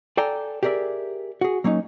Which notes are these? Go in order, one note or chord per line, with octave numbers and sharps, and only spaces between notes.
A4 D5 G5 G#5 A#5
G4 G#4 A#4 D5 E5
F#4 G#4
F#3 A#3 C#4 D#4